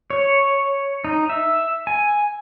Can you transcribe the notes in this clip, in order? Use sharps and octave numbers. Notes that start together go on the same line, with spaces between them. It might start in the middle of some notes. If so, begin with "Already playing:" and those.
C#5
D#4
E5
G#5